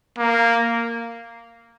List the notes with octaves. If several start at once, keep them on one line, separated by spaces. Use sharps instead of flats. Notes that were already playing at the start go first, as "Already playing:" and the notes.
A#3